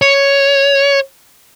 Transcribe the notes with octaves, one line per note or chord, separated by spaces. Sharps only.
C#5